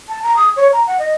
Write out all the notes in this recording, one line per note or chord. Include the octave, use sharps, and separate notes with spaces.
A5
A#5
D#6
C#5
A#5
F#5
D#5